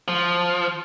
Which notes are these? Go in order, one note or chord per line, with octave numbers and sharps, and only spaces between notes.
F3